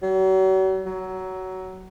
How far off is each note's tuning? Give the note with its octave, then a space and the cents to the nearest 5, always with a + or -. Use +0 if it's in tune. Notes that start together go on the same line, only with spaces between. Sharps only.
F#3 +40
F#3 +15